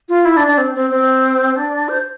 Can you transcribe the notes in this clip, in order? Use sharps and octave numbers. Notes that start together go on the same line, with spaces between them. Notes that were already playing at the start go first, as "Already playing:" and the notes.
F4
E4
D4
D4
C4
C4
C4
D4
C5